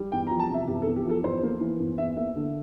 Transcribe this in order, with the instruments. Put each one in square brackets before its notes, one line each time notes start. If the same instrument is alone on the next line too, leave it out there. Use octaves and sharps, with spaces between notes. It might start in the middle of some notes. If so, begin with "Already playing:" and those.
Already playing: [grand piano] G3
E2 G5
A#5
F3
A5
C3 E5
E2 G4
A4
E2
G4
F3 A4
E2 C5
A#3
E3
E2
E2 E5
A#3 E5
D3